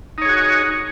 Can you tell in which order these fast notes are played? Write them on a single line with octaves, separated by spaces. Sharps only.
D#4 C#5 G#4 F#4